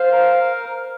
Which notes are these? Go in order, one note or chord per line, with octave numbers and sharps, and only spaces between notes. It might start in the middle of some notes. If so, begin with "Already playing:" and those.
Already playing: C5 F5
A#4